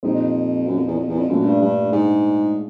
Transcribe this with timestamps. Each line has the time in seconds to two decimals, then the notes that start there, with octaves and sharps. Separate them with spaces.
0.03 F2 A#2 G3 C4 D#4
0.66 F#2
0.76 F2
0.87 E2
0.98 F2
1.08 E2
1.18 F2
1.29 F#2 A#2 F3 A3 D4
1.45 G2
1.61 G2
1.92 G#2